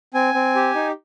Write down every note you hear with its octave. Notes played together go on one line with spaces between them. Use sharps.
C4 G#5
C4
G4
D#4